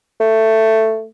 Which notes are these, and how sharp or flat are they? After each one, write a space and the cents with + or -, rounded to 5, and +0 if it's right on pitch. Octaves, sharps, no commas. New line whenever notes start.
A3 +10